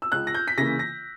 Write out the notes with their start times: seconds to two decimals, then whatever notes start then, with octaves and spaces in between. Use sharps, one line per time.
0.02 E6
0.12 C#2 F#6
0.27 A#6
0.34 G6
0.48 B6
0.58 C#3 E3 A#3 A#6
0.79 A#6